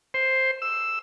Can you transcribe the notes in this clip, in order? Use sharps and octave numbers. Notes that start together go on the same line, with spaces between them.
C5
E6